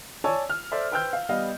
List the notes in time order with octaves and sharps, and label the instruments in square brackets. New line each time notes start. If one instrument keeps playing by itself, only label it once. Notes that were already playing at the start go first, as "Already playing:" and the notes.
[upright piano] C#5 D5 G#5 A5 E6
F6
A4 C5 D5 E5
B4 C5 G5 E6 F6 G6
F5
G3 B3 D#5 F5